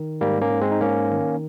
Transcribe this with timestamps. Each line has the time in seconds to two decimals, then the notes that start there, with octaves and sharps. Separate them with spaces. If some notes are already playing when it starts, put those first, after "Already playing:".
Already playing: D#3
0.21 G#2 G3 A#3
0.41 A#3 C#4
0.51 G#2
0.61 G#3 C4
0.72 D#4
0.81 G#2 A#3 C#4
1.11 D#3